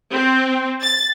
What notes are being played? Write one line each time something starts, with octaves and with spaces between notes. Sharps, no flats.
C4
A6